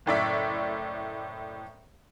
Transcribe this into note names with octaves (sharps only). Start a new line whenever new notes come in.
F#1 A2 D5 E5